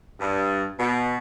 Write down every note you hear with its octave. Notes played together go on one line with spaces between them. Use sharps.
G2
B2